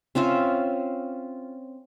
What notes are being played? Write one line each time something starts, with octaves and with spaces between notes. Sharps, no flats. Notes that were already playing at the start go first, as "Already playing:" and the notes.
C4 C#4 F4 E5